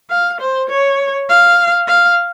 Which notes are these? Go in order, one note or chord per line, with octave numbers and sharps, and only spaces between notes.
F5
C5
C#5
F5
F5